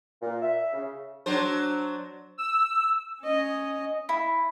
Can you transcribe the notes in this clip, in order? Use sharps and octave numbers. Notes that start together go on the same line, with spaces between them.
A#2
E5
C#3
F#3 D4 C5
E6
C#4 D#5
E4